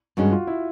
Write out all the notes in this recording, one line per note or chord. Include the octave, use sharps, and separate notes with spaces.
G2 D#3 G#3 C#4 F#4
F4
E4